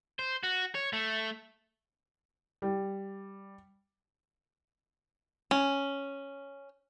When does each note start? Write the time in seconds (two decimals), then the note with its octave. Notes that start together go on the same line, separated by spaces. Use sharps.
0.19 C5
0.43 F#4
0.75 C#5
0.93 A3
2.62 G3
5.51 C#4